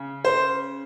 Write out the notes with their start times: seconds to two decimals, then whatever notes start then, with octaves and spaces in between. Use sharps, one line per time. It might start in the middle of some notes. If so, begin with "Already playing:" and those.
Already playing: C#3
0.25 C5